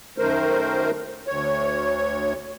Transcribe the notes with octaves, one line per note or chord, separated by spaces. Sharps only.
F#2 D#3 A3 A#4 C5
D2 C#5